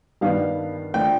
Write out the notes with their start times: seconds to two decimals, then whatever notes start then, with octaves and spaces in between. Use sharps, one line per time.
0.21 G2 D#3 G3 B3 F5
0.94 D3 F3 A3 D4 G5